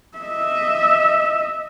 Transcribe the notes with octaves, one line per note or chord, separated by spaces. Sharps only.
D#5 E5